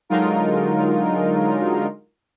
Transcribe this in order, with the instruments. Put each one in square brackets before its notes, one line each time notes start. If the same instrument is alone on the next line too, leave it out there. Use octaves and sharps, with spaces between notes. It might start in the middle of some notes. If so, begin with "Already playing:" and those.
[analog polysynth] D3 F#3 G#3 D#4 F4 A#4